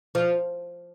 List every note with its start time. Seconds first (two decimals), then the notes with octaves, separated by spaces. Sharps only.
0.15 F3